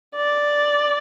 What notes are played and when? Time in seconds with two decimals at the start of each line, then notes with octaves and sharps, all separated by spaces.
0.15 D5